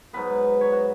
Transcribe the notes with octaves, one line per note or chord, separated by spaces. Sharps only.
G#2 F#3 B3 B4
C#5
F#4